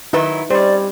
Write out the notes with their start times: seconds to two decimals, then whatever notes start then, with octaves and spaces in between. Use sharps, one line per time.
0.13 D#3 F#3 D#4 E4 B4
0.50 G3 C4 C#4 C5 D5 D#5